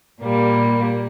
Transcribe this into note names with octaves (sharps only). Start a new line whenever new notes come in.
A#2 G3 A#3